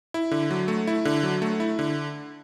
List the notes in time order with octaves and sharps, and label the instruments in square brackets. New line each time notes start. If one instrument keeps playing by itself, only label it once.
[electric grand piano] E4
D3
F#3
A3
E4
D3
F#3
A3
E4
D3